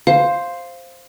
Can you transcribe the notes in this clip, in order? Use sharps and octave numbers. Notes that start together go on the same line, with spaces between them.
C5 F5